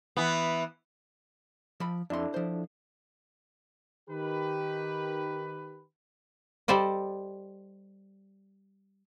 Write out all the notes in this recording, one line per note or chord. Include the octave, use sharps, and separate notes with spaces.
E3 B3
F3 B5
F2 D4 E4 A4 C6
F3 C5
D#3 G4 B4
G3 A4 C5 D5 D#5